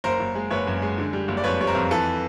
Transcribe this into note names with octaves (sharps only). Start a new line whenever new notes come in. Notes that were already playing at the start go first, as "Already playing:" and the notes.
F#1 A#4 C5
F#1
G#3
F#1 B4 C#5
F#2
G#3
D3
G3
F#1
D5
F2 B4 C#5
G3 C#5
A#4 C5
F2
E3 A4 B4